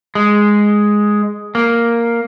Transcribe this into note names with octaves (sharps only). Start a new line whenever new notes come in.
G#3
A#3